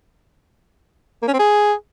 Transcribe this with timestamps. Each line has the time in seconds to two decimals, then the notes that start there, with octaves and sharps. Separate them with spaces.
1.22 A#3
1.28 C#4
1.34 C4
1.39 G#4